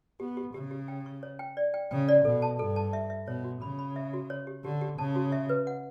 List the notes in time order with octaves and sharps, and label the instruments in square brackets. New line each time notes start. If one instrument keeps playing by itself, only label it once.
[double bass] B3 [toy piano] G4
[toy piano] G4
[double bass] C#3 [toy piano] G4
[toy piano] G4
G5
C#6
C#5
G5
D5
G5
[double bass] C#3 [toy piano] G5
[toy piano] D5
[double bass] B2 [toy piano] A4
[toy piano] A5
[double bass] G2 [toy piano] A4
[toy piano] A5
E5
E5
[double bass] B2 [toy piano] C#5
[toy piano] F#4
[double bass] C#3 [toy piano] B5
[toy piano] B5
E5
F#4
C#5
G4
[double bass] D3 [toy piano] G4
[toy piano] G4
[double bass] C#3 [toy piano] A5
[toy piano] F#4
E5
B4
F#5